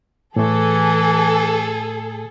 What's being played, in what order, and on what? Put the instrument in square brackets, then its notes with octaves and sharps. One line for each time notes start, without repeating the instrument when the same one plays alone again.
[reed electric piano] A2 A3 [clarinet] E3 [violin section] G#4 A4